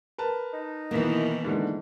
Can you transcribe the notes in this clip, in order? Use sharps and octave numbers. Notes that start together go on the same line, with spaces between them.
A#4 B4 A5
D#4
B2 D#3 E3 A#3 E4
G#2 D3